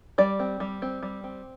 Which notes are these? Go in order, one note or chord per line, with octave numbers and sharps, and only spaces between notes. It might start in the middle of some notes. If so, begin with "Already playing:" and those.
G3 D5
C4
G3
C4
G3
C4